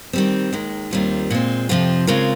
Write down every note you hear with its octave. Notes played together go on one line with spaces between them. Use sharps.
D#3 G3 C4
D#2 D#3 G#3
D#2 D#3 G3 C4 F4
A#2 G#3 C4
F2 C3 F3 C4 F4
C#3 G#3 C4 F4 A#4